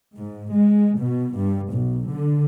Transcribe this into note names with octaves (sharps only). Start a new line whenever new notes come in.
G#2
G#3
B2
G2
B1
D3